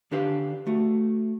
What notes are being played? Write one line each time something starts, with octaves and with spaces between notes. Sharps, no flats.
D3 D4 G4 B4 F5
A3 F#4